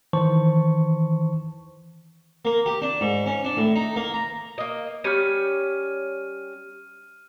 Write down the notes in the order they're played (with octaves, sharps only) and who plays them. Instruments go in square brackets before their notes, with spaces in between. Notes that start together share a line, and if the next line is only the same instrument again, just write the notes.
[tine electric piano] D#3 E3 C5 A5 C#6
[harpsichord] A#3
G4
D4
G#2
C#4
D4
A2
D#4
A#3
A#5
[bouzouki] A#3 D#5
[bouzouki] G3 C#4 [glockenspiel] F6 D#7